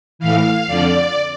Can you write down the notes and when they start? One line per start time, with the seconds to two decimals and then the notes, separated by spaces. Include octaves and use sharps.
0.19 A2 E3 F5
0.67 F2 D3 D5